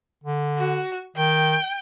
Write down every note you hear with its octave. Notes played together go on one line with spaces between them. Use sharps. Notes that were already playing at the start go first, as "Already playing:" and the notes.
D3
F#4
D#3 G5